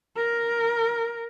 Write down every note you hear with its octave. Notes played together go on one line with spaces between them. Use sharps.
A#4